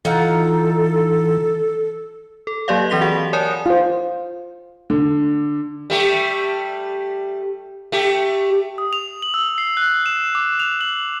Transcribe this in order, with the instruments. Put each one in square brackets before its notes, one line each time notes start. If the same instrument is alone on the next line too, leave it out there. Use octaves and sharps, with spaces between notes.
[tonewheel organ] E3 [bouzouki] D#4 F4 F#5 [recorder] A4
[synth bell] A4
F#3 A#3 G4 D5 D#5 F5
E3 C4 G4 B6 F7 G7
F#4 G#4 F#5
A#4 C#5 D5 G#5 A5 D#6
[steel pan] F4 C5
[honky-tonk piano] D3
[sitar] G3 A3 G4
A3 G4
[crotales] D#6
F7
F#7
E6
C7
F#6
E7
D6
F7
F#7